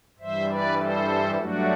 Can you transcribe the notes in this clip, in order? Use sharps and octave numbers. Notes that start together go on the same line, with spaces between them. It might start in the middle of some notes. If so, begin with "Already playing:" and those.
G2 E3 G3 C5 E5
B4 D5
A4 C5
G2 F#3 A3 D4 F#4